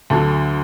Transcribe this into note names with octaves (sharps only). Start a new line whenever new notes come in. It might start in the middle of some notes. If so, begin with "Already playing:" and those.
D2 D3 F#3 A4